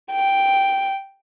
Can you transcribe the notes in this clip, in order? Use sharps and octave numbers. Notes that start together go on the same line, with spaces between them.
G5